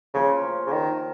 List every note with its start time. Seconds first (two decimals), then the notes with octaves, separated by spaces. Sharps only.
0.14 C#3 F3 A#3 F4 A#4
0.66 C#3
0.73 D#3